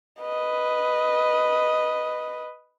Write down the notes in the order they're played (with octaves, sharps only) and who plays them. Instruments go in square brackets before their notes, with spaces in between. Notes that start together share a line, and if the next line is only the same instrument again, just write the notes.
[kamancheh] B4 D#5